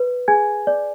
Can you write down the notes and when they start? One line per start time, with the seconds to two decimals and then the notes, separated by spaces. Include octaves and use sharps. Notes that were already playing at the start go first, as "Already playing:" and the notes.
Already playing: B4
0.28 G#4 G#5 G#6
0.67 D5